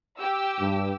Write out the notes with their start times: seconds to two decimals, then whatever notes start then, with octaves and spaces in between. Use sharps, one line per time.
0.18 G4 E6
0.60 G2